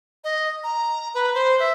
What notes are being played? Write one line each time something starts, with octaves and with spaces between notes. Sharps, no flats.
D#5
A#5
B4
C5
E5